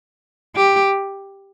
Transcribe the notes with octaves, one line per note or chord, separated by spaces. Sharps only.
G4